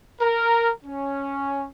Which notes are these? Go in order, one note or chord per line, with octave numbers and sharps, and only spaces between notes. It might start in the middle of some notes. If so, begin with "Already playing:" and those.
A#4
C#4